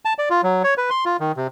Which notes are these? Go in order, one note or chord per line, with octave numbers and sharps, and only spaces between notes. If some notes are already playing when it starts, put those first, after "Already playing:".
A5
D5
F4
F#3
C#5
B4
C6
F4
D#3
C3